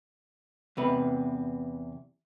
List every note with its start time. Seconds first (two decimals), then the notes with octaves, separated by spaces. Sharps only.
0.77 E2 C3 B4